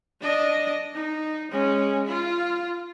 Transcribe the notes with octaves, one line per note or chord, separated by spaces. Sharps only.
D4 D#5
D#4
G#3 C#4
F4